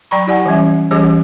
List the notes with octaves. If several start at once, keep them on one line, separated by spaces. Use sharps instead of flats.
F#3 D5 G5 A#5 B5 C#6
E4 G4 D5 F#5 G#5
E3 G3 C#4 E5
E3 G3 C#4 G4 G#4 C#5